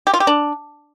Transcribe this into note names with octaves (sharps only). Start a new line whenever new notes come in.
G4
F4
G4
D4